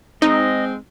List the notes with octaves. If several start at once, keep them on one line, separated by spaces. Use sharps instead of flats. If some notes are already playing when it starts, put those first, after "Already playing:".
G#3 C4 D#4 D#5